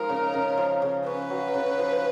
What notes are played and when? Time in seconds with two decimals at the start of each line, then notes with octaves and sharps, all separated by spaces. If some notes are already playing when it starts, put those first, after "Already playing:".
Already playing: F3 G#3 D#4 A#4
0.09 C#3
0.34 C#3
0.58 F3
0.82 C#3
1.06 C#4 B4
1.30 F#3
1.54 C#3
1.79 F3